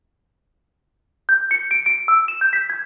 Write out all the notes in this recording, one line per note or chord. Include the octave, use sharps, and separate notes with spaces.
G6
C#7
D7
D7
E6
E7
G6
B6
G#6